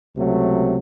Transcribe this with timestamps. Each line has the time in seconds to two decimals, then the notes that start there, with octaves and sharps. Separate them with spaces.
0.15 C#2 C3 F#3 A3